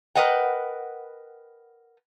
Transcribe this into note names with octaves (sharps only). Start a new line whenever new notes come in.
A#4 B4 D#5 F#5 G5